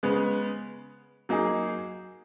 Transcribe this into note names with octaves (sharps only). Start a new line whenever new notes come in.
C#3 G#3 B3
F#3 A#3 D#4 G#4